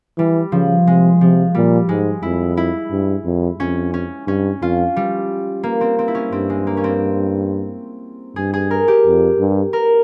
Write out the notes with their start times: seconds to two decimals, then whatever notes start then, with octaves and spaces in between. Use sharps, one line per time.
0.18 E3 G3
0.52 C#3 F3
0.86 C3 G#3
1.20 C3 F3
1.55 A#2 G3
1.88 G#2 G#3
2.23 F2 E4
2.57 E4
2.91 G2
3.25 F2
3.59 F2 C#4
3.94 C#4
4.27 G2 C#4
4.61 F2 F4
4.96 G3
5.63 A#3
5.81 C4
5.99 C4
6.08 E4
6.15 C#4
6.32 G2 C4
6.50 G#3
6.67 A#3
6.77 C#4
6.84 C4
8.36 G2 G#4
8.54 G#4
8.71 A#4
8.88 G4
9.06 F2
9.39 G2
9.73 A#4